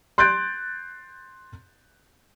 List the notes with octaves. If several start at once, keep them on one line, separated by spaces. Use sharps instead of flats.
C6 F#6 G6 A6 D7